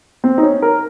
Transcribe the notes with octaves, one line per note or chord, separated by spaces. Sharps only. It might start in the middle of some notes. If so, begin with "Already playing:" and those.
C4
D#4
C#4
A#4